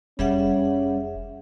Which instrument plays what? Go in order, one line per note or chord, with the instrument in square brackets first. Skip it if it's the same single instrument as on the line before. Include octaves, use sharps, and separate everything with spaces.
[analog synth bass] F1 [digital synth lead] G3 [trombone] C#4 [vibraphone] G#4 E5 F#5